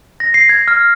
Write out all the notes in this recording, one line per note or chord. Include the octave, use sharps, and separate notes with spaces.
A#6
C7
G#6
F6